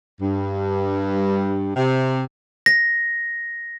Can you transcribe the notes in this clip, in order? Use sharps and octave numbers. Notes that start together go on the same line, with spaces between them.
G2
C3
A#6